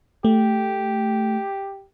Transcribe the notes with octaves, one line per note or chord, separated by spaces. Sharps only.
A3 G4